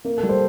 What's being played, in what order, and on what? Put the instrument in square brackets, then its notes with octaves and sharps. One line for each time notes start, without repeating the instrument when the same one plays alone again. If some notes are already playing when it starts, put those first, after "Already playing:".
[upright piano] A#3 A#4
A4
G3
C5